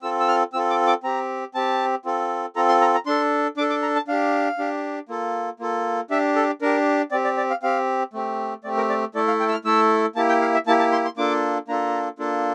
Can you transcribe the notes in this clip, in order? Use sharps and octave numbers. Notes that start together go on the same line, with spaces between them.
C4 F4 A4 E6
E6
F6
C4 F4 A4 E6
D6
D6
C4 G4 A#5
C4 G4 A5
C4 F4 A4
C4 F4 A4 A#5
C6
A#5
A#5
D4 A4 C6
D4 A4 D6
D6
A#5
A5
D4 G4 F5
D4 G4
A#3 F4 A4
A#3 F4 A4
D4 G4 E5
A4
D4 G4 A#4
C4 G4 D5
D5
D5
F5
C4 G4 F5
A3 C4 G4
A3 C4 G4 D5
A#4
D5
A3 E4 A4 D5
F5
G5
E6
F6
A3 E4 A4 E6
A#3 E4 G4 A5
G5
F5
E5
A#3 E4 G4 A5
A5
C6
C6
A#3 D4 F4 A4 D6
A#3 D4 F4 A4 A#5
A#3 D4 F4 A4